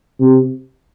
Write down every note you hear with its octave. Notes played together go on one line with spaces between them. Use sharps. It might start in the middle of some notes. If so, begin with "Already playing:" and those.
C3